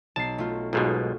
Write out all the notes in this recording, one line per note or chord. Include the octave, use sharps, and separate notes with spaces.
B1 A5 C7
A3 F4
B1 G#2 B2 F4